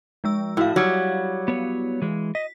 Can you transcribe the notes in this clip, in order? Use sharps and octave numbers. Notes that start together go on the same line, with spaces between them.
F3 G#3 E6
A2 E4 F#4 F5
F#3 G3
B3 C#5
E3 G#3
D#5 B6